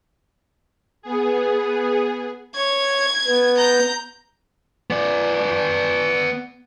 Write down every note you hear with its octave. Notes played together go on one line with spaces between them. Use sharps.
B3 G#4
C#5 G#6
B3
A#5 G6
B3 D5